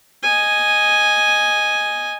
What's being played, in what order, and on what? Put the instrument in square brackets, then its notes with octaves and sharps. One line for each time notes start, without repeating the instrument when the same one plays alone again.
[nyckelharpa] D#5 G#5